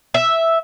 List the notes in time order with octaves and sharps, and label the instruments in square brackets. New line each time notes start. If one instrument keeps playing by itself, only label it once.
[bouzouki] E5